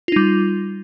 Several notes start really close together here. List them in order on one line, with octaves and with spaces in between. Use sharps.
F4 D#4 G3